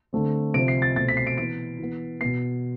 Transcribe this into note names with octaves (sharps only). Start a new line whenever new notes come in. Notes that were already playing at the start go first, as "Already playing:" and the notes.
D3 A3 C4
C3 F3 C4 D7
C7
A6
B2 A3 C4 A6
B6
C7
D7
E3 B3 D7
E3 B3
B2 B3 C7